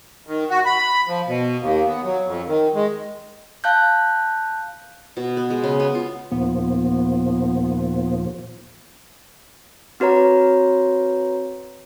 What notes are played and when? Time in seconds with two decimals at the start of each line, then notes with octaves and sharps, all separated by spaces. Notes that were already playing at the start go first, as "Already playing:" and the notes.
0.27 D#3
0.50 F#4
0.66 B5
1.08 F3
1.27 B2
1.60 D#2
1.87 B3
2.04 F#3
2.26 F2
2.46 D#3
2.75 G#3
3.64 F5 A5 F#6 G6
5.17 B2
5.37 B3
5.50 G#3
5.64 C#3
5.80 B3
5.95 F4
6.31 D#2 A#2 F3 B3
10.00 C4 F#4 B4 C#5 A#5